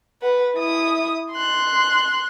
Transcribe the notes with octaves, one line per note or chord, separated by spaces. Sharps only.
B4 F#5
E4 D#6
C6 F#6